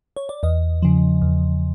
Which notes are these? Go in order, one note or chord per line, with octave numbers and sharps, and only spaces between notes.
C#5
D5
E2 D#5
C#3 F3
E2